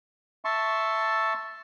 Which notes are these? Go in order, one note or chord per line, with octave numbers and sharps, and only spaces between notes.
E5 A5 C6 C#6